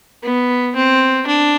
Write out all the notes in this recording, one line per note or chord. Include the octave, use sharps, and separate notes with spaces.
B3
C4
D4